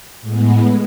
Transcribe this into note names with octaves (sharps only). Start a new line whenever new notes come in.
A2 G#3 B3